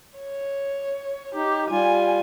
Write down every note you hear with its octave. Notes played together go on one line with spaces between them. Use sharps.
C#5
D#4 G4
G3 F4 G#5